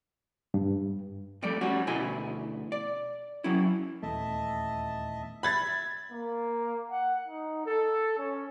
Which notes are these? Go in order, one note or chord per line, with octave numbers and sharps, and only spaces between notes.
G2
F2 G3 A3 D5
G3 C#4 F#4
D2 B2 E4 D#5 G#5
D5
F#3 C#4 E4
D#1 E2 A3 D#5 E5 A5
E5 B5 G#6 A6
A#3
F#5
D#4
A4
C#4